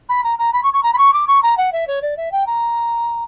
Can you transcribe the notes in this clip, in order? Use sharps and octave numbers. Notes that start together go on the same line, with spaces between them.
B5
A#5
A#5
B5
C#6
C#6
A#5
B5
C#6
D6
C#6
A#5
F#5
E5
C#5
D5
E5
G5
A#5